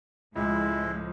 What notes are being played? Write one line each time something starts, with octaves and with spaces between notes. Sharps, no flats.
C#2 A2 F3 G#3 E4